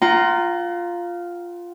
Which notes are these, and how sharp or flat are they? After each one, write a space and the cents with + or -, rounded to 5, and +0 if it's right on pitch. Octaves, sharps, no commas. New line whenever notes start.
F4 +0 F#5 +40 A#5 +0